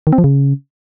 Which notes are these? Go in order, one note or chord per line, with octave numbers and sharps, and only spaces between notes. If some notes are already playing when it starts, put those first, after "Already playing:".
D#3
C4
F3
C#3